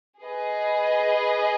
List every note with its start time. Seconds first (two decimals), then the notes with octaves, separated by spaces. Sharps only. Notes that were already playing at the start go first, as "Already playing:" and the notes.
0.22 G#4 B4 D#5